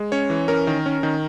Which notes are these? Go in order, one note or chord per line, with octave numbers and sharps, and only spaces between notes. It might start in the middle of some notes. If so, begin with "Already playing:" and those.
Already playing: G#3
C#4 C#5
E3
C#4 A#4
D#3
C#4
D#3